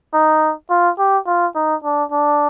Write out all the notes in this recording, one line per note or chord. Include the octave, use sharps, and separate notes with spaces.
D#4
F4
G4
F4
D#4
D4
D4